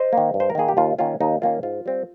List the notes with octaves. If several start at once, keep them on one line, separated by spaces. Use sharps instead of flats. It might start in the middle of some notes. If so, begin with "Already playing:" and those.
Already playing: C5 D#5
D#3 A#3
G2
C5
A#4
D#3 A#3 G#4
G4
D#2 F4
D#3 A#3 C#4 F4
D#2 D#4
D#3 A#3 C#4 F4
G#2 F4
G3 C4